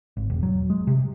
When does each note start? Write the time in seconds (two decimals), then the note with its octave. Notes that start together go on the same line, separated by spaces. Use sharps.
0.17 G#1
0.30 E1
0.43 F#3
0.70 G#3
0.87 C3